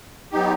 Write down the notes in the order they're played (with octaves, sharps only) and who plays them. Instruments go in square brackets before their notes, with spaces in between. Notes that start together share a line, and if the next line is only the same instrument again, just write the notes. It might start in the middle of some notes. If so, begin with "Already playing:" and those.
[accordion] F#3 B3 D#4 G4